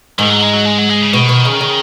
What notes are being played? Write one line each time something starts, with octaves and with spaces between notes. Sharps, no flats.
G#2 D#3
F#3
G#3
F#3
G#3
F#3
G#3
C#3
B2 D#3
B2
C#3
C#3